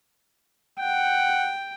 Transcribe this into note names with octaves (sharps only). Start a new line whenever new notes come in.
F#5 G5